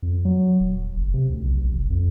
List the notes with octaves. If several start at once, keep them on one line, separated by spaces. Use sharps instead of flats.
F2
F#3
D#1
F#1
C3
D2
B1
A#1
F1
F2